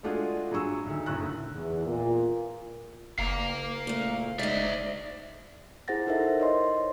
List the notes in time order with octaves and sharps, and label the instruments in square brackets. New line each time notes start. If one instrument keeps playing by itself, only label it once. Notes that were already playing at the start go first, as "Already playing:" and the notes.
[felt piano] G#3 A3 D4 F4 F#4 G#4
G2 F#3 G#4 G#5 C#6 E6
D2 D#3
F#1 A2 C#6 E6 F#6
[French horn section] E2
A#2
[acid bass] F#1 [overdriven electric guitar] F5 A#5
[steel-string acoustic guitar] A#2 A3
[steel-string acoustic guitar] G#3 D#4 [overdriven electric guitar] D5 E5
[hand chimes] E4 G#4 C5 F#5 A6 A#6
D#4 E4 A4 A#4 C5 E5
C#5 D#5 C6